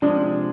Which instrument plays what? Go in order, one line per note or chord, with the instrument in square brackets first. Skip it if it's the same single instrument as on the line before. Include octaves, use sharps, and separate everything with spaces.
[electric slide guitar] C3 F3 G#3 [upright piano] D4